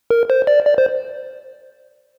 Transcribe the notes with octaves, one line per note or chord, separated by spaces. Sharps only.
A#4
C5
D5
D5
C5